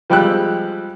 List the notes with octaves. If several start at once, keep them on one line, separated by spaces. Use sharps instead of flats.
F3 G3 G#3 G5 E6 F#6